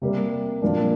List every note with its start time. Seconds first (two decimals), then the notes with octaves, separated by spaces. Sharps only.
0.02 C3 G3 A#3
0.62 A#2 F3 A#3 D4